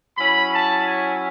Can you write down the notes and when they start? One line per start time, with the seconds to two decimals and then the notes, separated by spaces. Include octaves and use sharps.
0.17 F#3 C#4 E4 B5
0.53 A5
0.86 G#5